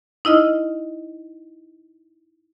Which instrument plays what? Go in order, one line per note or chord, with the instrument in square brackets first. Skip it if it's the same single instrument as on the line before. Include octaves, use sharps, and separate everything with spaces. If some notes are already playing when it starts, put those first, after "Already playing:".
[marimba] D#4 E4 D#5 F6